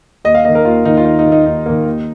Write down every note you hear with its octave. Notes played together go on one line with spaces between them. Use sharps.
D#2 D#5
F5
D#3 A#3 D#5
A#4
D#2 F4
D#3 A#3 D#4
F4
D#2 D#4
D#4
D#3 A#3
D#4
D#2 D#4
D#3 A#3
D#2